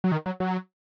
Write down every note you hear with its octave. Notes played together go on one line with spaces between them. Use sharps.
F#3
D#3
F#3
F#3